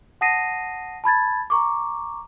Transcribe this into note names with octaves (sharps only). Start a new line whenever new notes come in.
F#5 A5 D#6 A#6 C7 D#7
A5 B5 G#6 A6
A#5 C#6 D6